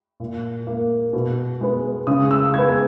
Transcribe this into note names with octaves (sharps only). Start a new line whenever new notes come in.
A#2
A#3
B2
G#3 B3
C#3 D#6
E6
G#3 B3 G#6